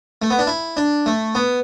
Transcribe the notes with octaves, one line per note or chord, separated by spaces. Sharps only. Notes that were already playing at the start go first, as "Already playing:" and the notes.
A3
B3
D4
E4
D4
A3
B3